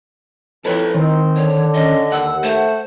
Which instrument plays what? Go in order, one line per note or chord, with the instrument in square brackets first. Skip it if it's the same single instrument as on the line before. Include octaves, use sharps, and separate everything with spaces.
[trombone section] F2 [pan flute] E4 [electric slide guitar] A4 B4 C#5
[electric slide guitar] D#3 [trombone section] C4 D#4
[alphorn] D3 [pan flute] C#5
[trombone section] C#4 [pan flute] D#5
[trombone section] D#2 [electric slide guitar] F#5 [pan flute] E6
[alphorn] A3 [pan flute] C5